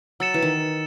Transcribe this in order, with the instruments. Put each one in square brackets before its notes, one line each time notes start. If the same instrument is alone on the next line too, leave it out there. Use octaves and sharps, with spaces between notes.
[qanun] F#3 [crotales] E6 A6 C#7 E7
[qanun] E3
D#3